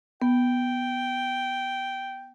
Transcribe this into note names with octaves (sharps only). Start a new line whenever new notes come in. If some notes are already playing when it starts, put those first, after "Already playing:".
B3 G5